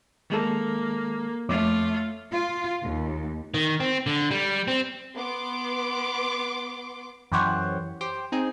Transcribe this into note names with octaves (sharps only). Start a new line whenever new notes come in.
D#3 G#3 A#3 A4
F2 A3 F4 C#5 D6
F4
D#2
D#3
C4
D3
G3
C4
B3 C6 D6
F#2 E3 G4 C5 C#5 F#5
G4 C5 G5
C4 D#4 G#4